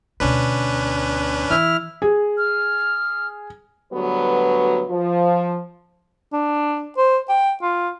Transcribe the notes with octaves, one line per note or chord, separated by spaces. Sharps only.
D2 B2 C#4 D4 B4
E3 E4 F6
G#4
F6
D2 F#3 G3 B3 F#4 B4
F3
D4
C5
G5
F4